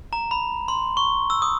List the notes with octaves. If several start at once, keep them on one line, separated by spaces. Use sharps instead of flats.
A#5
B5
C6
C#6
E6
D#6